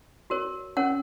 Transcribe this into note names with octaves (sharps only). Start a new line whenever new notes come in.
F#4 A#4 C#5
C#4 A#4 C#5 F#5